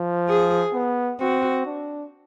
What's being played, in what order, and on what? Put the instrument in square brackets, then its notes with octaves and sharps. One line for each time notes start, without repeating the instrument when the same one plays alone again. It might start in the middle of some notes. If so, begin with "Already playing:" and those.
Already playing: [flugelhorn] F3
[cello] G#4
[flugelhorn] B3
[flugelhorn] C4 [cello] F#4
[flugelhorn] D4